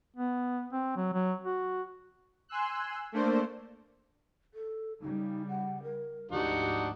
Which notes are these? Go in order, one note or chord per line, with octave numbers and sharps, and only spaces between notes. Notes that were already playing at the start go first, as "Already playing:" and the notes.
B3
C4
F#3
F#3
F#4
G#5 C6 E6 F#6
A3 A#3 D4 C5
A4
C#3 G3 D#4
F#5
A#4
D2 G#2 F3 D4 D#4 F#4 G4